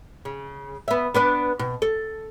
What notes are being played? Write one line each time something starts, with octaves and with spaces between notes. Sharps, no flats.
C#3
B3 E5
B3 D4 B4
B2
A4